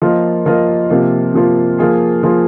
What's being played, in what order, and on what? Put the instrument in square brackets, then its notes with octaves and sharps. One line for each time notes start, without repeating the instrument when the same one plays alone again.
[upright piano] F3 A#3 F4 A#4 D#5
F3 A#3 F4 A#4 D#5
C3 F3 A#3 F4
C3 F3 A#3 F4
F3 A#3 F4 G#4
F3 A#3 F4 G#4